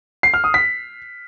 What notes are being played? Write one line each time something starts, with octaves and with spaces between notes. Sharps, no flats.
C7
F6
D#6
B6